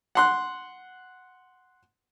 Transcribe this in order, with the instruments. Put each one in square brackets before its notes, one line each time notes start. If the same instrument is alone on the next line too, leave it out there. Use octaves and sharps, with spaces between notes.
[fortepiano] F#5 C6 F#6